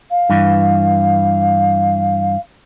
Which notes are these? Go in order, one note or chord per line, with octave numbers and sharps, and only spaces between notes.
F5
G2 E3